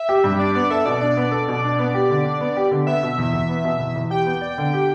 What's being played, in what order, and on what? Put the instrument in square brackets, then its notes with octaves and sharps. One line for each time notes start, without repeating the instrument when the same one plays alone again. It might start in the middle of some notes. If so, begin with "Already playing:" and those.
Already playing: [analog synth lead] E5
[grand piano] G4
G2
[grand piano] D4 [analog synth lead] D5
[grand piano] B3 [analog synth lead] D5
[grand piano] A4 [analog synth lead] E5
[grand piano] B2 [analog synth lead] D5
[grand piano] D4 [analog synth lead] D5
[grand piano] B3
A4
B2
D4
B3
G4
D3
D4
B3
G4
D3
[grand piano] B3 [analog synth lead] E5
[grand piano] B2
E2
E2
B3
B2
E2
E2
[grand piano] G4 [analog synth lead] G5
[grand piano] B3
D5
D3
G4